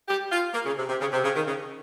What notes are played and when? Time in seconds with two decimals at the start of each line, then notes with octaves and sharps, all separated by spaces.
0.08 G4
0.31 F4
0.53 A#3
0.65 C#3
0.78 C3
0.89 C3
1.00 C#3
1.12 C3
1.23 C#3
1.34 D#3
1.46 C#3